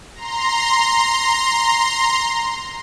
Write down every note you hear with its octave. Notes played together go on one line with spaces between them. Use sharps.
A#5 C6